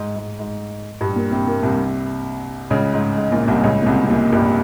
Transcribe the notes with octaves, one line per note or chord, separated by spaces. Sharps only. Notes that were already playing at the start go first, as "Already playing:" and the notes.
Already playing: G#2
G#2
G#2
G2 G3
A#2 A#3
C3 C4
A#2 A#3
C2 C3
C#2 C#3
G#2
G#2
A#1 A#2
C2 C3
C#2 C#3
A#2
C2 C3
C3
A#1 A#2
G2 G3